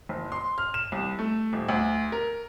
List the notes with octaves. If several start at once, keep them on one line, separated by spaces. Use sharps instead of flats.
F#1
C6
F6
E7
C2
A3
D#1
D2
A#4